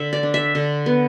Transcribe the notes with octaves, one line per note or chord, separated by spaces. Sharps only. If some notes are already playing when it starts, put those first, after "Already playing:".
Already playing: D3 E5
D5
D4
E5
D3
B3